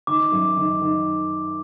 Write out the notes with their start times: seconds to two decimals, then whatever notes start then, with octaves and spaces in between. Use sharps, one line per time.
0.07 D#3 D6
0.32 F#2
0.57 D#3
0.82 D#3